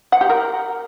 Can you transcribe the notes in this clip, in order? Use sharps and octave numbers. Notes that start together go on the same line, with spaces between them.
F#5
G4
A#4